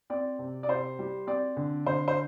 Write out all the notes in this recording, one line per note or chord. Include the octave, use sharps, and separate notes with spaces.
C4 D5
C3
D5
C3 C5
G3
C4 D5
D3
D3 C5
C5